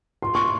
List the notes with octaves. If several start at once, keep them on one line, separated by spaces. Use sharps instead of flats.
C6
C#6